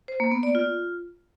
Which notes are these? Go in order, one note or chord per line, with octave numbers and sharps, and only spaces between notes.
C5
A#3
B3
D5
F4